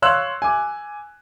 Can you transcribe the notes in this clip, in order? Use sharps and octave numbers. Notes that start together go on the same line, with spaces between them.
C#5 F5 C6 E6 F#6
G#5 D6